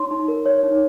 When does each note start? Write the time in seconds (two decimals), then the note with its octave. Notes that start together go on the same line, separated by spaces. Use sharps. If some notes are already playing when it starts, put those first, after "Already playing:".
Already playing: D#4 C#5 C6
0.11 D#4
0.28 A#4
0.46 C#5
0.63 D#4